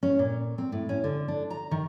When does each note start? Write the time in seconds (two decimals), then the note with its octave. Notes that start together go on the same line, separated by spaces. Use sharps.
0.03 C#4
0.19 A#2
0.58 C4
0.72 A2
0.89 C#4
1.04 D3
1.28 D4
1.50 A#5
1.71 D#3